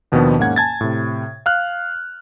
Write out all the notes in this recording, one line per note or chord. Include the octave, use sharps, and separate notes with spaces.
D#2 B2 D#3 F3 B3 D4
G#2 A#3 C#4 F#5 G#6
G#5 A5 G#6 A6
A2 C3
F5 F6 F#6